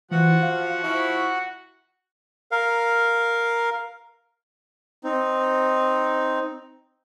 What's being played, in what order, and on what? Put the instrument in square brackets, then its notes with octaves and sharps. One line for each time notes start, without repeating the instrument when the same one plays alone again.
[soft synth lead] E3 [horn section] F3 [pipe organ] F#4 F#5
[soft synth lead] F5
[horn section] F3 E4 [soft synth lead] C#6
[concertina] A#4 F5
[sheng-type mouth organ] C4 D#4